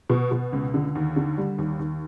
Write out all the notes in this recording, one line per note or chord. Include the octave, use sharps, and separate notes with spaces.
B2
B2
C#2
D3
D#2
D3
G3
D#2
D#2